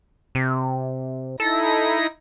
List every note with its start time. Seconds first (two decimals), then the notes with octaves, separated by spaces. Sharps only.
0.35 C3
1.40 D#4 E4 A4 A#6